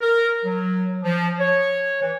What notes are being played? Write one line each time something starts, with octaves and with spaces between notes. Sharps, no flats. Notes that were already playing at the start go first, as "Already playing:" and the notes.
A#4
F#3
F3
C#5
E3